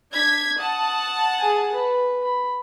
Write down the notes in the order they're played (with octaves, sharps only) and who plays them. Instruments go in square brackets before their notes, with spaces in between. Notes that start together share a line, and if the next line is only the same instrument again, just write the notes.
[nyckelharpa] D4 [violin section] G#6 B6
[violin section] F#5 A5 [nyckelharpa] D#6
[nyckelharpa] G#4 G#5
B4
B5